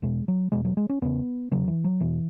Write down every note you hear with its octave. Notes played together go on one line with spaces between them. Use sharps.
E2 B2 G#3
F#3
E2 B2 G#3
F#3
G#3
C#4
E2 C#3 B3
E2 C#3 F#3
E3
F#3
E2 B2 E3